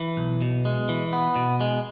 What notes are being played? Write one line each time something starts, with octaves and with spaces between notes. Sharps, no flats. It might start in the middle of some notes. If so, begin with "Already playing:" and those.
Already playing: E3
B1
B2
G#3
E3
B3
B2
G#3